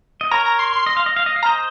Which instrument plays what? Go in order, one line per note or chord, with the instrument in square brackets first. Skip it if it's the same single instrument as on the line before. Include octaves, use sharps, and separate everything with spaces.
[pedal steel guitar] D#5
[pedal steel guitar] A#4 C#5 [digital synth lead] A#5
[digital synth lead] A#5
C6
C6
[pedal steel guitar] D#5
F5
D#5
F5
D#5
F5
[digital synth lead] A#5
[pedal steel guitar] C5 D#5